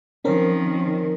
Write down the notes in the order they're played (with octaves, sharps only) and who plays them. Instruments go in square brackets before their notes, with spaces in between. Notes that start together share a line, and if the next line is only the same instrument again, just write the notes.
[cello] D#3 F3 [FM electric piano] C4 C#4 A#4